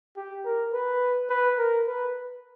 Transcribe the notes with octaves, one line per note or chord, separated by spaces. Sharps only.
G4
A#4
B4
B4
A#4
B4